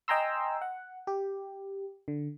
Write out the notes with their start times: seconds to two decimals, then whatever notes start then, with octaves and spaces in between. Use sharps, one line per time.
0.08 D#5 G5 G#5 A#5 C6 E6
0.62 F#5
1.07 G4
2.08 D3